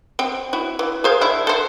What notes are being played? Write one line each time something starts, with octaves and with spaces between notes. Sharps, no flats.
C4 G5
E4 F#4
E3
G#4 C5 F5
D#3 D4 E4
A4 C5